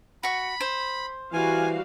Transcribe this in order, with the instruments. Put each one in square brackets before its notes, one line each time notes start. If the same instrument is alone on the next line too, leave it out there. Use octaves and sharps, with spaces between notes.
[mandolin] F#4 C#6 [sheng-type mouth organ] B5
[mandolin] C5
[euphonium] E3 [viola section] G3 F#4 F5 [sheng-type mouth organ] G#5